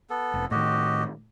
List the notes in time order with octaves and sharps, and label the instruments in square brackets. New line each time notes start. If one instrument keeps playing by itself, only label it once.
[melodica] B3 A4
[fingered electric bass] F1
[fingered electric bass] A2 D#3 [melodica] F#4 G4 D#5